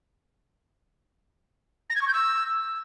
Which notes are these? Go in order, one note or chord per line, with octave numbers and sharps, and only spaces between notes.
A#6
G#6
C#6
G6
E6